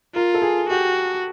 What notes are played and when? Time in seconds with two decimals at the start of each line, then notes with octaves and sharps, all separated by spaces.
0.15 F4 A#4
0.34 A4
0.42 G#4
0.69 F#4 G4